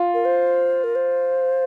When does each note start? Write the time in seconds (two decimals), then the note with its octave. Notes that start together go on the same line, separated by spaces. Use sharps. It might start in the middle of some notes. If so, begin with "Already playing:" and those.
Already playing: F4
0.14 A#4
0.25 C5
0.84 A#4
0.95 C5